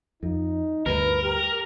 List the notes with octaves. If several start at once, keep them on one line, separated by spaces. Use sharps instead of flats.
F2 D#4
D2 G2 A#4 B4
G4